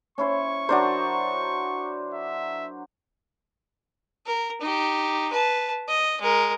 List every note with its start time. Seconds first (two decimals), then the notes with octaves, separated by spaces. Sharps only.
0.18 C#4 E4 C5 C#6
0.69 F#3 D4 A#4 C5 D5
2.14 E5
4.27 A#4
4.61 D#4 G4
5.32 B4 A5
5.88 D#5
6.21 G#3 A#4